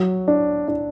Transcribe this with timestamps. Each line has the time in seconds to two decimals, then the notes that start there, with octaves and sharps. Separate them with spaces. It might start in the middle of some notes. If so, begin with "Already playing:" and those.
Already playing: F#3
0.28 D4
0.68 D4